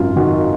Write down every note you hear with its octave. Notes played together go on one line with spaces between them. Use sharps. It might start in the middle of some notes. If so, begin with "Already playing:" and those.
Already playing: G#1 F#2 F4
D#3 F#4